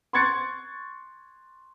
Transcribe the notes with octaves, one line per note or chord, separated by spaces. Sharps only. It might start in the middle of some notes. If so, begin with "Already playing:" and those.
C6 C#6 F#6 G#6 A6 C#7